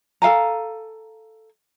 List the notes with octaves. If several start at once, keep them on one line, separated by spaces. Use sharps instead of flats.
A4 F5 G#5 A#5